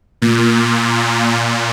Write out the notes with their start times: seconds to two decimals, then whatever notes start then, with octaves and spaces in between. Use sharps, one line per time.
0.22 A#2
1.38 A#2